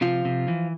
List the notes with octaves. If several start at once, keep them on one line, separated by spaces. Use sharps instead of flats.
C3 F3 F4
C3
E3